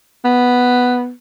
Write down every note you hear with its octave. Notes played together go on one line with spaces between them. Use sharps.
B3